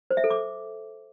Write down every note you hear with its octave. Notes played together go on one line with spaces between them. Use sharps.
C5
E5
A4
D6